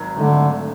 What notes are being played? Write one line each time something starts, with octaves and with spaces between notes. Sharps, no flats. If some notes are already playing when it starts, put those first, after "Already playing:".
Already playing: G#1 F#3
G#1 G#2 D3 F#3 A3